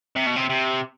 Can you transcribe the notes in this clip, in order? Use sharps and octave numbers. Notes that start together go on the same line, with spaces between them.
C3
B2
C3
C3